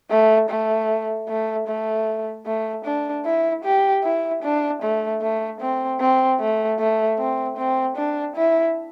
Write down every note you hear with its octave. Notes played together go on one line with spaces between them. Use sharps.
A3
A3
A3
A3
A3
D4
E4
G4
E4
D4
A3
A3
C4
C4
A3
A3
C4
C4
D4
E4